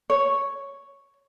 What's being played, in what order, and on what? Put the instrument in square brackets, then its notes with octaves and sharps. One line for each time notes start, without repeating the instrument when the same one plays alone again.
[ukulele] C#5